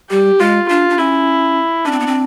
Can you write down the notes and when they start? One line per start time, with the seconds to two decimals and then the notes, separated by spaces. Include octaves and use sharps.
0.10 G3 G4
0.39 G#3 F4
0.69 D4 F4
0.90 D4
0.98 C#4 E4
1.85 C#4 D4
1.92 C4
2.00 B3
2.07 C4